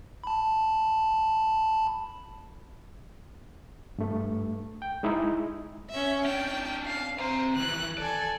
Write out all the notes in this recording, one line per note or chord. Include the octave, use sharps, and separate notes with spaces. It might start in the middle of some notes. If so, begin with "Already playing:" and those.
A5 B5
G2 A3
G5
G#3 D#4 E4
C#4 E5
C#4 D4 G5
F5
C4 C5 A#5
D#3 E3 F#6
A4 D5 G#5